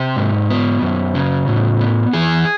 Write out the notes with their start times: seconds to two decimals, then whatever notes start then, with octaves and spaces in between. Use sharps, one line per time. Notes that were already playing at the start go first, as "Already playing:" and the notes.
Already playing: C3 G4
0.16 G#2
0.50 B3
0.82 F#2
1.15 C#3
1.48 A2
1.81 B3
2.13 E3 G#4